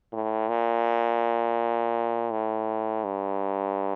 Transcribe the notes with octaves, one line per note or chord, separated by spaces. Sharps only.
A2
A#2
A2
G2